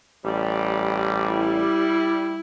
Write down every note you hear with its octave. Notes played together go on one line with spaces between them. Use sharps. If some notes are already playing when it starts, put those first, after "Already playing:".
A1 G3
E4